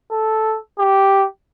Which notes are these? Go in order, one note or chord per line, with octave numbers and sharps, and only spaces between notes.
A4
G4